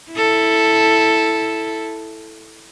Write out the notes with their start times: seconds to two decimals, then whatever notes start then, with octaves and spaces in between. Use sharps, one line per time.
0.12 E4 A4